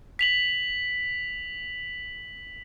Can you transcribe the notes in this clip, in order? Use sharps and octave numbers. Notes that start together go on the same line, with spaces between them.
B6 F7 F#7